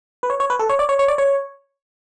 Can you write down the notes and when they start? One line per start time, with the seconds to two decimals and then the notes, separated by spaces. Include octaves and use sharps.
0.23 B4
0.30 C#5
0.40 C#5
0.50 B4
0.59 A4
0.69 C#5
0.79 D5
0.89 C#5
0.99 C#5
1.08 D5
1.18 C#5